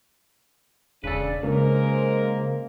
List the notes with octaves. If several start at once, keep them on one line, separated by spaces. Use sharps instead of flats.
E1 C#3 D4 A4 B4
C#2 C#3 G#3 A#3 A#4 C5